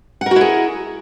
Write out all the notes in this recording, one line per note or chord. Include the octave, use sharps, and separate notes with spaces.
E4 F#4 G#4 A#4 F#5